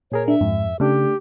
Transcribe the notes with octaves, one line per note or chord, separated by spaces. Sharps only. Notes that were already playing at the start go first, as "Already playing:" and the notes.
A#2 G#4 A#4 C#5
D4 E5
F2 G#2
C#3 A3 D4 G4